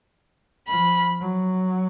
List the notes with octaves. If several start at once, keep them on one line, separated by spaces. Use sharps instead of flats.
F3 B5
F#3